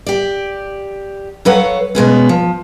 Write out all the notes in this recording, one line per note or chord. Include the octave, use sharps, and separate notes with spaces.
G4 D5
F#3 A4 B4 C#5 F5 F#5
B2 G#3 B3 C#4
F3